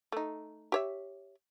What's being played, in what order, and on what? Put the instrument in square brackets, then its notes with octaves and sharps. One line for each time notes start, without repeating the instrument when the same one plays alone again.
[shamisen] A3 D#4
G4 C#5 E5